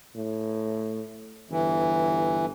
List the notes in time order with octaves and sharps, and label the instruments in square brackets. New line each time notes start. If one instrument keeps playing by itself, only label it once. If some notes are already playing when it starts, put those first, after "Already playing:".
[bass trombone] A2
[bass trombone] G1 [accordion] E3